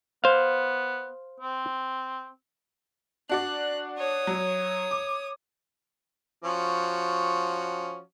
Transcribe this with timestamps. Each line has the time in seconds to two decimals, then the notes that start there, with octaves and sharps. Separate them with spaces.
0.24 B3 C5 F5
1.40 C4
3.29 D4 F#4 D5 F#6
3.97 C#5 D#6
4.27 F#3
4.91 D6
6.44 F3 C#4 F#4